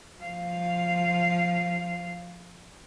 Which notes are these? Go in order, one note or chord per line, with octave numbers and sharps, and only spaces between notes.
F3 F5